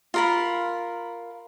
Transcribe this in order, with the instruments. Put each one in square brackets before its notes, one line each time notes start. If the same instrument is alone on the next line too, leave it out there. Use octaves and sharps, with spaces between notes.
[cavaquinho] F4 A#4 B5